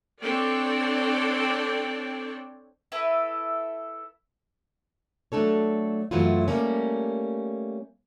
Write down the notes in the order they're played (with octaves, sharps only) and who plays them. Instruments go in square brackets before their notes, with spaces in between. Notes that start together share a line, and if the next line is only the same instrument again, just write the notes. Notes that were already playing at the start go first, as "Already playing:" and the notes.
[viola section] C4 D4 A4 C#5 D5 G5
[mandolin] E4 A4 B4
[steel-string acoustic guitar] F#3 A3 D4 A4 C#5
F#2 E3 F#3 A3 E4 F4
G3 A3 A#3 C#4